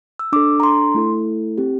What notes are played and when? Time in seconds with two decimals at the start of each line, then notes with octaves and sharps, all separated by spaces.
0.19 E6
0.32 D4 A4 D6
0.60 A#5
0.63 C6
0.94 A3 E4 A4
1.58 C4 G4